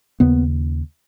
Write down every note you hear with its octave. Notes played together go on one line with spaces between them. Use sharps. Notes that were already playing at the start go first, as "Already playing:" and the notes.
D#2 C#3 B3